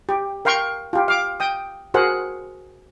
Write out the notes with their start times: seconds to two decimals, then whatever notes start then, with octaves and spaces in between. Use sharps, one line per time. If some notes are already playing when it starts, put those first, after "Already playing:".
0.09 G4
0.45 A#4 F5 G5 C6 C#6
0.93 F4 G4
1.08 F5 D6
1.40 G5 D#6
1.94 F#4 G#4 A#4 C5 F#5